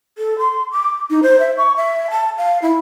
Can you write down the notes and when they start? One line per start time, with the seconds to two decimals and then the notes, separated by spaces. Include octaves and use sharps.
0.18 A4
0.39 C6
0.72 D6
1.10 D#4
1.23 C5
1.40 E5
1.57 C#6
1.76 E5
2.11 A5
2.37 F5
2.62 E4